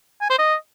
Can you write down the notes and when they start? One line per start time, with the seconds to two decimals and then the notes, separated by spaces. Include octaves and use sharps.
0.21 G#5
0.30 C5
0.38 D#5